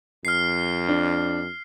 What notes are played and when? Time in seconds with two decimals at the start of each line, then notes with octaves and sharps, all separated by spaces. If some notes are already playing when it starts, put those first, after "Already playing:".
0.25 F2 F6 C7
0.89 D4